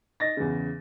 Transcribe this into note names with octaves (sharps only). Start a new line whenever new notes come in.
D#5 A6 A#6
E2 C#3